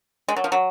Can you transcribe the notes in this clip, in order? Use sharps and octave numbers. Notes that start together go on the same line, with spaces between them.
G#3
F#3
F3
F#3